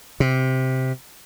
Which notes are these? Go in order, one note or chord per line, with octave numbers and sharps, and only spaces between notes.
C3